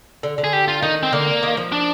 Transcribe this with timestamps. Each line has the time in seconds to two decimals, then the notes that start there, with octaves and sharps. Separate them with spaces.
0.23 D3
0.38 D3
0.44 G#4
0.53 G4
0.68 F4
0.82 D#3 D#4
1.03 C4
1.13 D3 A#3
1.43 D#3
1.57 F3
1.72 D4